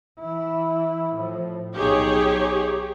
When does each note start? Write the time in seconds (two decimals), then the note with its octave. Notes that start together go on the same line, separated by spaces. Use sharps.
0.19 E3 E4
1.13 A2 F3
1.76 B1 D#4 G4 G#4 C#5